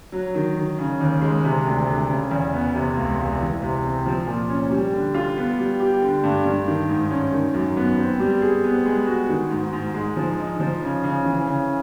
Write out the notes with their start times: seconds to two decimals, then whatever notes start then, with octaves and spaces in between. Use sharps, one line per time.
0.12 F#3
0.35 D#3
0.56 D#3
0.79 C#3
1.00 D#2
1.21 G#3
1.44 C3
1.66 D2
1.87 D2
2.09 C#3
2.31 E2
2.53 B3
2.74 C3
2.97 C#2
3.19 C#2
3.40 E3
3.62 C3
3.84 C4
4.06 F3
4.27 A#2
4.49 C#4
4.70 G3
4.93 D3
5.14 F4
5.37 B3
5.59 G3
5.80 G4
6.01 D3
6.24 G2
6.45 G2
6.67 D#3
6.89 G#2
7.10 C#4
7.33 D#3
7.54 F#2
7.77 B3
7.98 C4
8.19 G3
8.42 G#4
8.64 B3
8.86 G#3
9.07 F#4
9.29 D#3
9.50 G#2
9.73 G#2
9.94 G#3
10.16 F3
10.39 D#4
10.60 F3
10.82 C#3
11.04 C#3
11.25 E3
11.47 C#3